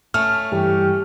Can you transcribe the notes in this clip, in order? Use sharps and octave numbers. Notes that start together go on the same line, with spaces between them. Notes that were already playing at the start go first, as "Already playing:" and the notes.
A3 C#4 F6
G2 E3 G3 G4